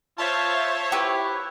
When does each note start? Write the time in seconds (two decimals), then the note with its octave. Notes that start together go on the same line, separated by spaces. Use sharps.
0.18 F4 C5 C#5 E5 A5
0.92 E4 G4 B4